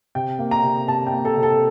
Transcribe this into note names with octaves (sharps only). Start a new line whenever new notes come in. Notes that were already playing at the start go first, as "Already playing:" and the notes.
C3 G5
A#3
A#5
C3
C3 A5
G5
A#3
A4
C3
A4